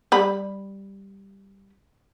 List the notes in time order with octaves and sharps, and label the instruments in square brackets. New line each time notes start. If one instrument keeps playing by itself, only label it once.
[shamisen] G3 B5